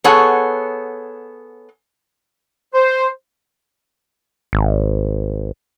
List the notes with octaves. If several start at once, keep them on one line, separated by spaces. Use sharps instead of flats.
B3 G#4 A4 C#5 F#5
C5
G#1